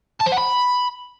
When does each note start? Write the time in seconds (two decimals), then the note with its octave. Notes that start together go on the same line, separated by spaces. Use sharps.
0.21 A5
0.27 C5
0.32 F#5
0.38 B5